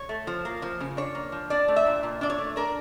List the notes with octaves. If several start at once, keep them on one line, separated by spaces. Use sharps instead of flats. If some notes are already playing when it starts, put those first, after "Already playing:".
Already playing: C#5
A3
F3
A#3
F3
C#3
D4 C#5
A#3
F3
D4 D5
A3
E5
A#2
A#2
D4 D5
C#5
A3
D4 A#4